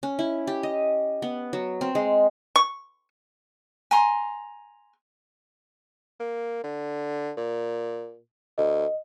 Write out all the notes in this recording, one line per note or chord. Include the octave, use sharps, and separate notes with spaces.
C#4
E4
G4
D#5
B3
F#3
C4
G#3
C#6
G#5 A#5 C6
A#3
D3
A#2
D2 D#5